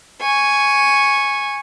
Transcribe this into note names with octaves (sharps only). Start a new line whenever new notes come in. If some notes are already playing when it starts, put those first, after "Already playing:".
G#5 C#6